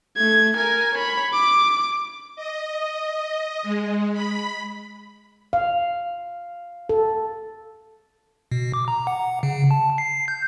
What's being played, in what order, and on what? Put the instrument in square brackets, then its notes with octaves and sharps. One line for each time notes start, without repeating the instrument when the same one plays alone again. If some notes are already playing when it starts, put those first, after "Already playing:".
[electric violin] A3 G#6
A#4 G#5
C#5 B5
D6
[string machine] D#5
G#3
B5
[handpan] F5
A4
[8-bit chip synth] B2
D6
A#5
F#5
C#3
A5
C7
G6